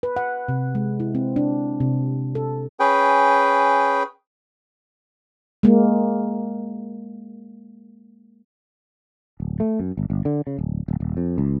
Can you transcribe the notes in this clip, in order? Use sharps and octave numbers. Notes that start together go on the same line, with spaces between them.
B4
F#5
C3
G#3
E4
C4
D4
C3
A4
C#4 G#4 B4 G5
G#3 A#3
D1
A3
F#2
G1
G1
D3
C#3
D1
D1
D#1
F2
C#2